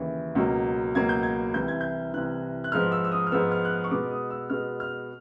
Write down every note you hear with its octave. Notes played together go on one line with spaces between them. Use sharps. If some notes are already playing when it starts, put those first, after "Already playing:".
Already playing: D#2 C#3 E3
C#2 B2 F#3 A#3
C#2 B2 F#3 A#3 G#6
G6
G#6
C2 C3 E3 G6
G#6
G6
C2 C3 E3 F#6
F#6
G#2 F3 G#3 B3 F6
E6
E6
D#6
F6
G#2 F3 G#3 B3 E6
F6
F#6
F6
C#6
B2 G#3 B3 D6
D#6
E6
B2 G#3 B3 F6
F6